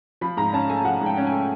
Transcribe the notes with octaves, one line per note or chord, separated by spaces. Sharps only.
F3 B5
G#2 A#5
C#4 A5
A3 G#5
F3 F#5
G#2
G5
C#4
G#5
A3